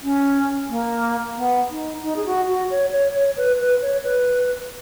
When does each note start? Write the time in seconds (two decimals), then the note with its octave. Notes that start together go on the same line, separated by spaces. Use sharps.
0.02 C#4
0.69 A#3
1.36 B3
1.70 D#4
2.03 D#4
2.16 G#4
2.26 F#4
2.48 F#4
2.70 C#5
2.92 C#5
3.15 C#5
3.37 B4
3.60 B4
3.82 C#5
4.03 B4